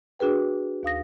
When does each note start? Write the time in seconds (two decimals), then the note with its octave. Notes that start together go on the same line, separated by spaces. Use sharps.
0.19 D4 F#4 G#4 B4 G5
0.83 D#2 F5 D#6 A#6